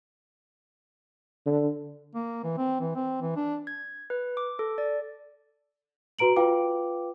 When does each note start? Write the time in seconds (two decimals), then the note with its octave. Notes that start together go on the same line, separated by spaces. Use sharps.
1.46 D3
2.15 A#3
2.44 E3
2.58 C4
2.81 E3
2.96 C4
3.21 E3
3.36 D4
3.67 G#6
4.10 B4
4.37 D6
4.59 A4
4.78 D5
6.19 F#4 B4 A#5 D7 F#7
6.36 F4 B4 F5 G5 D6